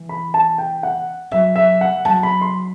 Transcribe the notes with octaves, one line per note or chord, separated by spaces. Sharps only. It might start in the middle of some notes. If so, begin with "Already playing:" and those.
Already playing: E3
B5
A5
G5
F#5
F#3 E5
E5
F#5
F#3 A5
B5
C6